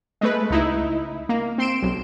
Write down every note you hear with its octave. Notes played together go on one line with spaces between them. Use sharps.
G#3 A3 B4
C#2 D#4 E4
A#3
C4 C6 D7 E7
B1